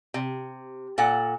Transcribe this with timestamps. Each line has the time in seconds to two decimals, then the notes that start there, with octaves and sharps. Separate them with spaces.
0.14 C3
0.98 A#2 A4 F#5